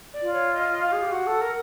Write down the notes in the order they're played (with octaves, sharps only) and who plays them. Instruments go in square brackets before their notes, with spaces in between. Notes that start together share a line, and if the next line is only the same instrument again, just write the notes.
[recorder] D5
[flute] F4
[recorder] C#5
D#5
F5
[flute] G#4
G4
[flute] F#4 [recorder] F#5
[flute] A4
A#4